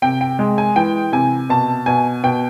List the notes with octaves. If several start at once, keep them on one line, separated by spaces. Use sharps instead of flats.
C3 G5
G5
G#3
G#5
E3 G5
C3 G#5
B2 A5
B2 G#5
B2 G5